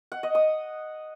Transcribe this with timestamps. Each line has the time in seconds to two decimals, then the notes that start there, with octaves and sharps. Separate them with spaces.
0.12 F#5
0.23 D#5
0.35 D#6